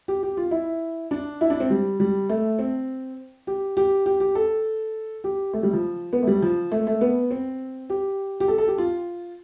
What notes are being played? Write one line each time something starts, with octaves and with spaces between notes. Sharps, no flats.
G4
G4
F4
E4
D4
E4
D4
C4
G3
G3
A3
C4
G4
G4
G4
G4
A4
G4
A3
G3
F3
B3
A3
G3
F3
A3
A3
B3
C4
G4
G4
A4
A4
G4
F4